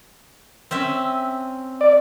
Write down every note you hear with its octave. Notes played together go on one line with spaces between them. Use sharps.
C4 C#4 E5
D5